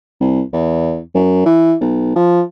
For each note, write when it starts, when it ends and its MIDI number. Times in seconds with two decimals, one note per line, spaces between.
0.20 0.42 36
0.53 1.00 40
1.15 1.43 42
1.45 1.75 52
1.81 2.15 35
2.16 2.41 53